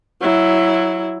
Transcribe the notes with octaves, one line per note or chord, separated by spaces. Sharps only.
F#3 E4